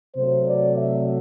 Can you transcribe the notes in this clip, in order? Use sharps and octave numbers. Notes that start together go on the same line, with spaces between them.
C3 F#3 A3 C5
D5
E5